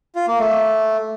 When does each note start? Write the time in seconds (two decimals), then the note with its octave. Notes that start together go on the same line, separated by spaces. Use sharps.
0.16 F4
0.28 A#3
0.39 A3